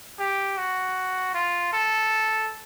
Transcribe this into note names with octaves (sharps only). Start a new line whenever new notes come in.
G4
F#4
F4
A4